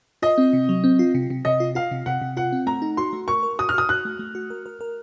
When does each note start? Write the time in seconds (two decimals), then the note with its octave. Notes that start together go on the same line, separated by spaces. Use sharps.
0.22 F4 D#5
0.38 C4
0.53 C3
0.69 F#3
0.84 C4
0.99 F4
1.15 C3
1.30 C3
1.45 C3 D#5
1.60 F4
1.75 F4 F5
1.91 C3
2.06 C3 F#5
2.22 C3
2.37 F4 F#5
2.52 C4
2.67 A3 A#5
2.82 D#4
2.97 F#4 C6
3.13 A3
3.28 A#4 C#6
3.43 A#4
3.59 F#4 D#6
3.69 F6
3.74 F#4 D#6
3.89 F#4 F#6
4.05 A3
4.19 A3
4.35 F#4
4.50 A#4
4.66 A#4
4.81 A#4